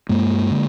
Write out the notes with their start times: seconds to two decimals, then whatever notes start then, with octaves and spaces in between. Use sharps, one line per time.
0.09 G2 G#3 A#3
0.51 D3